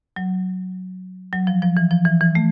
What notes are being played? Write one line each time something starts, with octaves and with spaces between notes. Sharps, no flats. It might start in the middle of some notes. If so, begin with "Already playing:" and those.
F#3
F#3
F3
F3
E3
F3
E3
E3
A3